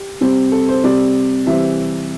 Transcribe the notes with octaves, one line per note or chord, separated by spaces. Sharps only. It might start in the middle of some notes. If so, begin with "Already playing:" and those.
Already playing: G4
C3 G3 C4
A4
C5
C3 G3 C4 D5
C3 E3 G3 C4 E5